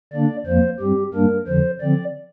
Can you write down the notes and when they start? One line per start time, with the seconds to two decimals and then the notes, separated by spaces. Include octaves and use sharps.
0.13 D3 A#3 D4 D5
0.46 F2 F3 A#3 C5
0.80 G2 G3 C4 G4
1.14 G2 G3 A#3 D4 A#4
1.47 F2 D3 F3 C5
1.81 D3 F3 C4 D5